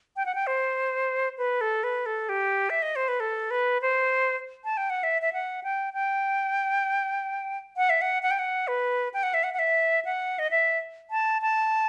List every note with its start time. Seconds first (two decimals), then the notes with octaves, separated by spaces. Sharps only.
0.16 G5
0.26 F#5
0.35 G5
0.47 C5
1.38 B4
1.61 A4
1.84 B4
2.06 A4
2.29 G4
2.70 E5
2.82 D#5
2.96 C5
3.08 B4
3.20 A4
3.51 B4
3.82 C5
4.64 A5
4.77 G5
4.90 F#5
5.03 E5
5.22 E5
5.33 F#5
5.64 G5
5.94 G5
7.77 F#5
7.90 E5
8.01 F#5
8.23 F#5
8.31 G5
8.39 F#5
8.68 B4
9.14 G5
9.23 F#5
9.34 E5
9.44 F#5
9.54 F#5
9.59 E5
10.05 F#5
10.39 D#5
10.51 E5
11.11 A5
11.42 A5